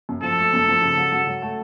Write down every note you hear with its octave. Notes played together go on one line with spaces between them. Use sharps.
F#2
F3 A4
A3
F#2
F3
C#3
F#3
F#3
F#3
A3